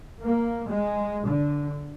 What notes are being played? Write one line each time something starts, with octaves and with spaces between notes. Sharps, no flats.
A#3
G#3
D3